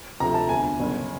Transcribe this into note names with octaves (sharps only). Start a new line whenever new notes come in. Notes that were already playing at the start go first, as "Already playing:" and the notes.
D2 C3 F3 A3 A#5
A5
E1 D2 D3 G#5
G1 F#2 C#3